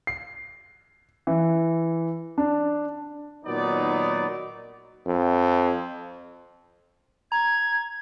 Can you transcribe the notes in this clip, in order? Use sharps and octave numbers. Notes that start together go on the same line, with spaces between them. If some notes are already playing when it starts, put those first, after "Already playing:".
C7
E3
D4
A#2 D#3 F#3 B3 D#4 D5
F2
A#5 G#6